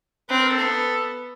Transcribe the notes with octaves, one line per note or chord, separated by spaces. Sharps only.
C4 B4
A#4
A4
B3